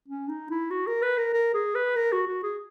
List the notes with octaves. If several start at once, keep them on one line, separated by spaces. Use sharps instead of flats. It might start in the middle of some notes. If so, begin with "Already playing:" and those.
C#4
D#4
E4
F#4
A#4
B4
A#4
A#4
G#4
B4
A#4
F#4
F#4
G#4